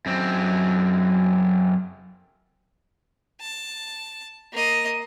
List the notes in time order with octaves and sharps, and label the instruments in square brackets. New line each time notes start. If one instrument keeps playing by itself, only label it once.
[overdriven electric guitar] F#2 C4
[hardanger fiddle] A5
A#3 D#5